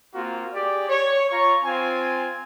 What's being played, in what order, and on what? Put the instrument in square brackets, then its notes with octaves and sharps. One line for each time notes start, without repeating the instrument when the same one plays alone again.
[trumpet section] A#3 C4 F4 F#4 A#4
G4 G#4 D5
C#5
F4 A#5 C#6
C4 F4 G#5